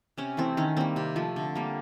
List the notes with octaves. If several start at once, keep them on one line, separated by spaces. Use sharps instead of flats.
C3 C#4
E3 A3 C4
D#3 C#4
G3 A#3 C4
C3
F3 A3
D3
G3 A#3